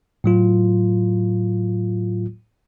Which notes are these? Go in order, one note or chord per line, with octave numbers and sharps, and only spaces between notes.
A2 F#3 F4